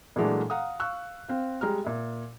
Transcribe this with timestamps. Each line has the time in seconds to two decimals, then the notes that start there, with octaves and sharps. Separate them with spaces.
0.16 A#2 E3 F#3 G#3 A3 D4
0.50 F5 F#5 A#5 D#6
0.80 F5 C#6 E6 F#6
1.29 C4 F5
1.61 G3 G#3 A#5 F6
1.85 A#2 E5